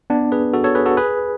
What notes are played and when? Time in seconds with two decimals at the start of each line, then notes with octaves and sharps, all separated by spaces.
0.10 B3 D4
0.32 G#4 B4
0.54 F#4 A4
0.64 A4 C#5
0.75 G#4 B4
0.86 F#4 A4
0.97 G#4 B4